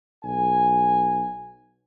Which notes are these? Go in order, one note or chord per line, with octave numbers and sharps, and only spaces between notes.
B1 F#4 G#5